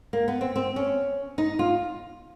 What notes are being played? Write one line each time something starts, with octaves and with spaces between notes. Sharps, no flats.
A#3
B3
C4
C4
C#4
D#4
F4